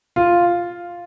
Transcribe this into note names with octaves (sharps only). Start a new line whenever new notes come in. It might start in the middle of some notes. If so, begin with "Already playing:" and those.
F4